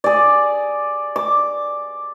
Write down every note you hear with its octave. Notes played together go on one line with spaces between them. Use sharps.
G#4 D5
D6